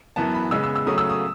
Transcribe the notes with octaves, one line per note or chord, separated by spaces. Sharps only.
F#2 E3 B3 A5
B5
C#3 G#3 B3 E6
E6
E6
C#3 F#3 A3 C#4 D#6
E6
D#6